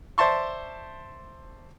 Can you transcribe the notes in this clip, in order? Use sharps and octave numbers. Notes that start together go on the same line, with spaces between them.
C5 D5 E5 A5 C6 C#6